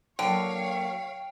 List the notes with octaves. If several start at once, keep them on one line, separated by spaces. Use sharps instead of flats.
A2 D3 F#3 A#3 C#5 F5 G5